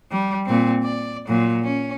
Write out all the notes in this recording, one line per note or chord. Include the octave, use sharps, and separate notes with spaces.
G3
A#2 C4
D5
A#2 F#3
C#4